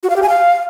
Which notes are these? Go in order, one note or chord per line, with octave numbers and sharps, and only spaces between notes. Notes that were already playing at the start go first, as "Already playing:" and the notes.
F#4
F5
G4
G#5
F5